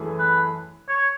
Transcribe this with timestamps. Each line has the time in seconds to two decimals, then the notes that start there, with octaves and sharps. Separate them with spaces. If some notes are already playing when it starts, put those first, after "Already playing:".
Already playing: F#2 E3 A3 E4 G#4
0.20 B4
0.89 C#5